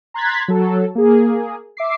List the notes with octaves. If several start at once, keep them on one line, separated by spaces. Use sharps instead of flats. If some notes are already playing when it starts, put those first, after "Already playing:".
A#5 C6 F#6 G#6 A6 B6
F#3 A4
A#3 G#4
E5 D6 C7